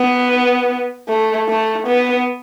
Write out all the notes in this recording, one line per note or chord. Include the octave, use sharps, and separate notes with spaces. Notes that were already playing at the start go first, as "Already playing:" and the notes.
Already playing: B3
A3
A3
B3